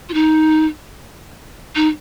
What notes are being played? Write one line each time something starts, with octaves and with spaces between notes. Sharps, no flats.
F4
D#4
D#4